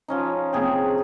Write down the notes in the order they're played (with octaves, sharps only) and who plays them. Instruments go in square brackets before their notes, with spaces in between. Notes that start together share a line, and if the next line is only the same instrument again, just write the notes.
[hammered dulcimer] F3 C#4 D#4
[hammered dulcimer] C3 G#4 [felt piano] C4 G5